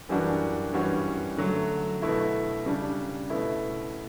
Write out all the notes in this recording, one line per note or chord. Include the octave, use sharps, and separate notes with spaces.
F#2 E3 G3 D4 F#4
G2 E3 G3 C#4 F#4
D3 F#3 A3
B2 A3 E4
C#3 G3 D4
B2 A3 E4